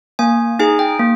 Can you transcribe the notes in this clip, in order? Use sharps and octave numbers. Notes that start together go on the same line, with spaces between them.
A#3 G#5
D#4 G#4 G#5
G5
A#3